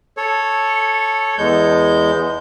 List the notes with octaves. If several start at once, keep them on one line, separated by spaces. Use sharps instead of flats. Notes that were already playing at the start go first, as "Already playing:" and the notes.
A4 C#5
E2 G#3 G6